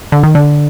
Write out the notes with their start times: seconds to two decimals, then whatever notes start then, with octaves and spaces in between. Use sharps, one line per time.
0.12 D3
0.23 D#3
0.35 D3